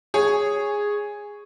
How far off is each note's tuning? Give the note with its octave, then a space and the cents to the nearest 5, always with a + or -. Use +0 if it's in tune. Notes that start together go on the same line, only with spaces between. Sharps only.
G#4 -5 C#5 +0